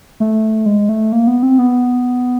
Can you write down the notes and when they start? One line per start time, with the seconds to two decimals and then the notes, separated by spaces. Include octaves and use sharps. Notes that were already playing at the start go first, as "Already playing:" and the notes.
0.20 A3
0.66 G#3
0.89 A3
1.12 A#3
1.27 B3
1.43 C4
1.58 B3